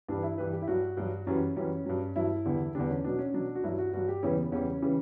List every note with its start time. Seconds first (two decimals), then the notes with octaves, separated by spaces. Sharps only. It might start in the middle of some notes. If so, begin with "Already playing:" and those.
0.08 G2 E3 G3 D4
0.23 E4
0.38 G2 E3 G3 B4
0.53 G4
0.62 E4
0.67 G2 F#3 F#4
0.97 G2 F#3
1.26 F#2 E3 G3 C#4
1.56 F#2 E3 G3 C#4
1.86 G2 F#3
2.16 G2 F#3 E4
2.45 E2 D3 G3
2.75 E2 D3 G3 D4
2.90 C#4
3.04 B2 F#3 D4
3.19 C#4
3.34 B2 F#3 D4
3.55 F#4
3.63 G2 F#3 E4
3.79 F#4
3.93 G2 F#3 F#4
4.08 G4
4.23 E2 C#3 E3 G3 C#4
4.38 B3
4.52 E2 C#3 E3 G3 C#4
4.82 C#3 E3 G3